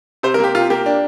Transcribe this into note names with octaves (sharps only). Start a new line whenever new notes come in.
C3 C5
A#4
A#3 G4
C3 F4
A#3 G4
D4